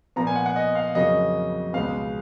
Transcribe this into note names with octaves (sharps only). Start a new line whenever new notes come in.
A#2 F3 B3 A#5
G#5
F#5
F#5
D#5
F5
F2 C#3 F#3 A#3 D#5
C#2 B2 G#3 B3 F5